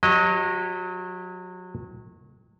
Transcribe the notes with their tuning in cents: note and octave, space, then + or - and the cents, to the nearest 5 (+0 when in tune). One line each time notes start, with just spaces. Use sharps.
F#3 -30 G4 +0 D#5 +0